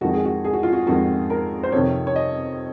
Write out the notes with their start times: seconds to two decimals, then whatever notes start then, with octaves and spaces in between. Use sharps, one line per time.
0.01 F2 D#3 G#3 F#4
0.14 G#4
0.25 F#4
0.45 G#4
0.54 F#4
0.63 F4
0.73 F#4
0.86 F2 D#3 G#3 F#4
1.30 A#4
1.63 C5
1.72 F2 C3 D#3 C#5
2.07 C#5
2.16 D#5